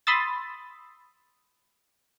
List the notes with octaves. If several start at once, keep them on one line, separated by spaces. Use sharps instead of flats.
B5 C6 D#6 E6 A6